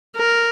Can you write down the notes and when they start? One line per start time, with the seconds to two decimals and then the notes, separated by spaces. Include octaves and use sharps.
0.17 A#4